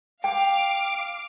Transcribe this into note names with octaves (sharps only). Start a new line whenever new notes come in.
F5 G5 D6